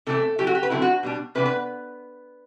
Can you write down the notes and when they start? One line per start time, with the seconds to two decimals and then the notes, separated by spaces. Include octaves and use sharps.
0.06 C3 E3 A3 C4 A4
0.38 F#3 A3 E4 G4
0.47 F#4
0.55 G4
0.63 B4
0.70 D3 F#3 C4 E4 A4
0.82 F#4
1.03 B2 G3 D4
1.35 C3 E3 B3 D4 B4
1.46 B4